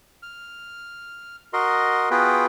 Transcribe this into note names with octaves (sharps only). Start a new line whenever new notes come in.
F6
F#4 A#4 D#5 C6
B3 F4 F#4 G#4 B4 G5